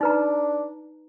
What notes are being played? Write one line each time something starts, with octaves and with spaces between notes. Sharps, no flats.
D4 D#4 B4 A#5